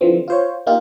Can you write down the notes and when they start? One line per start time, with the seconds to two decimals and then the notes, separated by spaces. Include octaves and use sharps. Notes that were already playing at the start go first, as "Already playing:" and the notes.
0.01 D3 E3 F3 C4
0.28 F4 C5 C#5
0.67 A#3 D#4 F4 G4